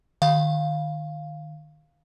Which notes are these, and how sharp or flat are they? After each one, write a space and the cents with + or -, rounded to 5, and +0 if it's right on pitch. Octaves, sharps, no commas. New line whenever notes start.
D#3 -25 F5 +0